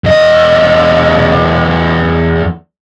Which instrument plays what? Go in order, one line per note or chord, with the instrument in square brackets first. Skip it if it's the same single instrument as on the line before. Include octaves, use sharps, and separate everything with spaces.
[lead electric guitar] E2 D#5